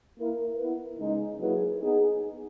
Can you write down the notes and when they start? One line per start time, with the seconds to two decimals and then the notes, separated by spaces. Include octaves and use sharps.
0.17 A#3 E4 A#4
0.57 B3 E4 B4
0.99 C#3 G#3 D#4
1.39 F#3 A#3 E4 G#4 B4
1.80 B3 D#4 G#4